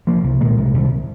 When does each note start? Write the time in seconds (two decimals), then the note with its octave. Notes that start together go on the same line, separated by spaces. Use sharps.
0.07 C2 F3 A#3
0.24 C2
0.41 A#2 D#3 G#3
0.58 C2
0.74 C2